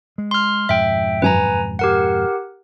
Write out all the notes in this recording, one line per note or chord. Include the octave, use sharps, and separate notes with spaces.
G#3
C6 F6
F2 G#2 B2 E5 G5
G#1 F#2 B4 G#5 A#5
G4 A#4 F#5